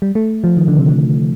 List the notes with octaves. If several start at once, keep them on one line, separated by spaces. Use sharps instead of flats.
G3
A3
F3
D#3
D3
C3
D3